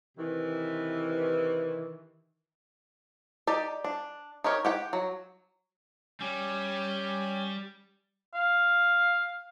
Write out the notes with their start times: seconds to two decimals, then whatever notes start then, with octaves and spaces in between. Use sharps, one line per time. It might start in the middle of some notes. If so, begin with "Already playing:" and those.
0.17 C3 D#3 E3
3.47 D#4 G4 D5
3.84 D4
4.44 D#4 G4 A#4 C#5
4.65 G4 F#5 G5
4.93 F#3
6.20 G3 C#4 G4 G#5
8.34 F5